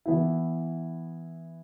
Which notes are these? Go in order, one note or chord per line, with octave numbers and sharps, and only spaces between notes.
E3 B3 E4